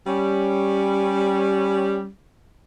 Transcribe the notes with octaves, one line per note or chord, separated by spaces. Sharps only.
G3 C#4